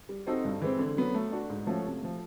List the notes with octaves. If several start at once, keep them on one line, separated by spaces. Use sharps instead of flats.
G3
C4 D#4 F#4 A4
G2
E3 G#3 C4
D3
F#3 B3
A3
D4 F#4
G#2
F3 A3 C#4 F#4
C3
F3 A3